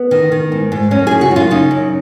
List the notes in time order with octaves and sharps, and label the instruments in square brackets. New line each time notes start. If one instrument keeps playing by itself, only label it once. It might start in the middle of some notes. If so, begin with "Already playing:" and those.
Already playing: [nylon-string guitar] B3
D#3
D#3
G#2
G#2
F#2 C#4
C#3 G#4
F#4
F#2
F4
C#3 D#4
F#2